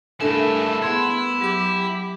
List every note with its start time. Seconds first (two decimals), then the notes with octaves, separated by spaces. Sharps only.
0.20 G2 A3 D4 E4 A4 A#4 G#5 E7
0.82 B3 E4 G#4 C6 G#6
1.41 F#3 G4 D6